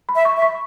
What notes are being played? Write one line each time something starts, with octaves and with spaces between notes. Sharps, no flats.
B5
E5
C#6
E5
C#6